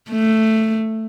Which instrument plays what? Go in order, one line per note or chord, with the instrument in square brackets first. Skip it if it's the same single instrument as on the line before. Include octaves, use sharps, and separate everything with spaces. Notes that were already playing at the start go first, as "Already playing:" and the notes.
[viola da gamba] A3